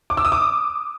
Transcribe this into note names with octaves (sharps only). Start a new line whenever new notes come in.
D6
E6
D#6
D6